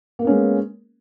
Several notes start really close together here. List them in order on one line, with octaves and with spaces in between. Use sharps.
A#3 A#4 B3 C#4 G#3